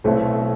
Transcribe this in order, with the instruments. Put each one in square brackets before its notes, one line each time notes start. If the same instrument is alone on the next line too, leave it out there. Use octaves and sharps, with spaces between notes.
[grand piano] B1 B2 A3 C4 E4